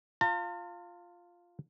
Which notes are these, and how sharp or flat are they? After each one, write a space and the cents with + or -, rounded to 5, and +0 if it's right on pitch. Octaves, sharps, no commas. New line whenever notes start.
F4 +0 A5 +45